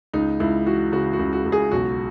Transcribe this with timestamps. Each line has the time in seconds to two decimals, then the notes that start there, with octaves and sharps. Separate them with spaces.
0.13 C#2 D#4
0.40 C#2 E4
0.66 E3 F#4
0.92 C#3 F#4
1.13 F#4
1.19 C#2
1.33 F#4
1.46 C#2
1.52 G#4
1.71 B1 F#4